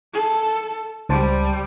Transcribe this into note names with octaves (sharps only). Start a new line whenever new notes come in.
A4
C#2 G3 C5 A5